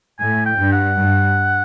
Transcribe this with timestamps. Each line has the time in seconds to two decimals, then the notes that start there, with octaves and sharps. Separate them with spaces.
0.19 A2 G#5
0.46 G5
0.59 G2
0.73 F#5
0.99 G2